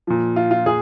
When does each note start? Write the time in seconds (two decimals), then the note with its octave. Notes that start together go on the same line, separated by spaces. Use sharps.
0.07 A#2 F3
0.36 F4
0.51 F4
0.66 A#2 G#4